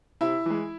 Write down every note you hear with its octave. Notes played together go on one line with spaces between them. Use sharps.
C3 E4 E5
E3 G#3